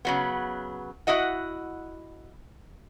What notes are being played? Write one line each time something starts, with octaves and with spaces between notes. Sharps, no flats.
C#3 F#3 B3
E4 F#4 D#5 F#5